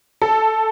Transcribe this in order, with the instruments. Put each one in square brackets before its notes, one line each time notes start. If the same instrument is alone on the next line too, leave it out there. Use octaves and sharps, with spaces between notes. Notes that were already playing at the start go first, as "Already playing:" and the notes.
[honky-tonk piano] A4